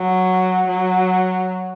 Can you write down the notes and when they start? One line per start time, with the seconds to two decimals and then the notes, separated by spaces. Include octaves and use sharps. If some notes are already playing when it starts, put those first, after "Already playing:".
Already playing: F#3
0.68 F#3